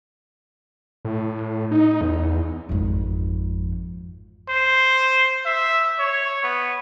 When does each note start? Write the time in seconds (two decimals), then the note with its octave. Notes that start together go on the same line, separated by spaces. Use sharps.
1.05 A2
1.71 D#4
2.01 E2
2.69 G#1 F2
4.49 C5
5.46 E5
5.99 C#5
6.43 B3